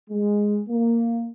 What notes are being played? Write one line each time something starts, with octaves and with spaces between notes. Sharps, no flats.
G#3
A#3